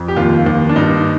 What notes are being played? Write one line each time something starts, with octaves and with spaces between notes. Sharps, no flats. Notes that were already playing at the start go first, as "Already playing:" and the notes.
Already playing: F2
G4
D#2 F4
D#2
D4
G2 D#4